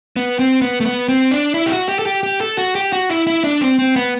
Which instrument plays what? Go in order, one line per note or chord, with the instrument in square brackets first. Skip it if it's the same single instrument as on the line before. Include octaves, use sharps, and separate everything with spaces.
[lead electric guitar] B3
C4
B3
A3
B3
C4
D4
E4
G4
F#4
G4
A4
G4
G4
A4
F#4
G4
F#4
E4
E4
D4
C4
C4
B3